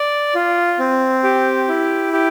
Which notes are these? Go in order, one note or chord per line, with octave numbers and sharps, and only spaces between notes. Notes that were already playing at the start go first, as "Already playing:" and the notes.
Already playing: D5
F4
C4
G4
E4
G4